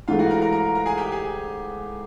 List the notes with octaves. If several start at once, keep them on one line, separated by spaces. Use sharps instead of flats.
G#2 E3 A3 F4 F5
F#4 F#5
A#4 A#5
A#4 A#5
A#4 A#5
A#4 A#5
G#4 G#5
G4 G5
G#4 G#5